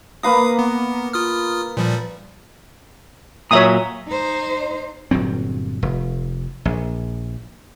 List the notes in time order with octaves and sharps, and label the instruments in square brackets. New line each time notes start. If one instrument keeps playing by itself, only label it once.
[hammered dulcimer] A#3 B4 A#5 [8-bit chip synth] F5 D#6
[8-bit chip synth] B3
F4 D#6 F6
A#2 F3 G3
[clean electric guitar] A#2 F#3 [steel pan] C#5 E5 D#6
[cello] D#4 C5
[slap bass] G1 A#2 F#3 C4
F1
A#1